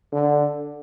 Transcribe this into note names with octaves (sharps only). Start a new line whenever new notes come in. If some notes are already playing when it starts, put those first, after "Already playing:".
D3